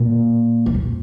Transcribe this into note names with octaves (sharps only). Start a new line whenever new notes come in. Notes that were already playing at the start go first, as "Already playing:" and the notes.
Already playing: A#2
E2
F2